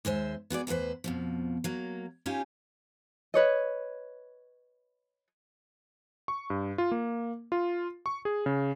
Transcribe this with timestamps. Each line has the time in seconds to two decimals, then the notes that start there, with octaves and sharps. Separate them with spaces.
0.05 D#2 G#3 C5 E5
0.50 B3 F#4 G#4 D5
0.67 E2 A2 D#4 B4 C5
1.04 F2 B2 F3
1.64 F#3 A#3
2.26 C#4 D#4 F4 G4 G#5
3.34 B4 C#5 D#5
6.28 C#6
6.50 G2
6.78 F4
6.92 A#3
7.52 F4
8.06 C#6
8.25 G#4
8.46 C#3